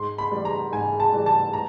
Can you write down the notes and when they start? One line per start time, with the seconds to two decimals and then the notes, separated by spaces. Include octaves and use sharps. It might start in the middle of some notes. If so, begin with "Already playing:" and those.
Already playing: G#2 C6
0.18 B5
0.31 E3 G3
0.45 A#5
0.72 G#2 G#5
1.00 A5
1.12 E3 G3
1.26 A5
1.53 A#5